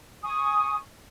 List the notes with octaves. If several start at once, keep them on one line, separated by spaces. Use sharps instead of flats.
G#5 C#6 D#6